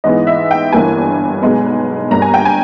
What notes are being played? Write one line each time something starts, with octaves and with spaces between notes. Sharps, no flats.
G#2 E3 G#3 B3 D#5
E5
G5
G1 G2 E3 A#3 G#5
B1 B2 G#3 B3
G1 G2 G3 A#3 A#5
G#5
G5
G#5